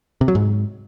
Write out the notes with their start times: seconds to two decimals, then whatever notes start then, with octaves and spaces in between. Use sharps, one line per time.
0.21 C3
0.28 F#3
0.35 G#2